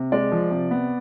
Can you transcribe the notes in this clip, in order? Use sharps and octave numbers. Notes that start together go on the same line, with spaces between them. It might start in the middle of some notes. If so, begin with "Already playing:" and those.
Already playing: C3
G#3 D5
F3
C3
B3